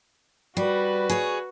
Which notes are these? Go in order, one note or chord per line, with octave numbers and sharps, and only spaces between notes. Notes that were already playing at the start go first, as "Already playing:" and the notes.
G3 F#4 B4
G#4 C#5